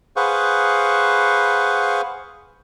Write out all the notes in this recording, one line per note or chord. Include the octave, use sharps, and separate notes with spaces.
G#4 B4 C5 F5 F#5 C#6